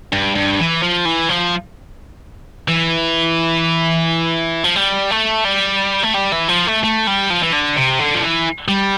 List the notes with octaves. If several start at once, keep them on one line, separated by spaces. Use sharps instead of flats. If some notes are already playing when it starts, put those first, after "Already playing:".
G2
G2
E3
F3
E3
F3
E3
F3
G3
A3
G3
A3
G3
E3
F3
A3
A3
G3
F3
E3
D3
C3
D3
F3
E3
G3